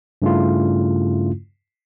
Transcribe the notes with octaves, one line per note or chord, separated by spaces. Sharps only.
G2 C#3 A3 C#4 E4 F4